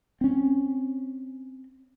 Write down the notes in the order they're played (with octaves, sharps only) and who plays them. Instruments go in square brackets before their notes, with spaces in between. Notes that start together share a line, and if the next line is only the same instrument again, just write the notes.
[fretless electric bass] C4 C#4